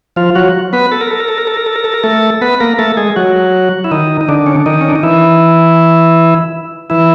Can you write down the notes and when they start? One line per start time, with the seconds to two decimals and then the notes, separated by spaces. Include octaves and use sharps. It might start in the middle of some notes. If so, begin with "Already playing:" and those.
0.16 F3 F4
0.35 F#3 F#4
0.73 B3 B4
0.92 A4
1.01 A#4
1.11 A4
1.20 A#4
1.29 A4
1.38 A#4
1.47 A4
1.57 A#4
1.66 A4
1.76 A#4
1.84 A4
1.94 A#4
2.04 A3 A4
2.41 B3 B4
2.60 A#3 A#4
2.79 A3 A4
2.97 G#3 G#4
3.16 F#3 F#4
3.84 E4
3.91 D#3 D#4
4.21 D#4
4.29 D3 D4
4.46 C#4
4.56 D4
4.66 D#3 D#4
4.81 C#4
4.89 D4
4.95 D#4
5.03 E3 E4
6.90 E3 E4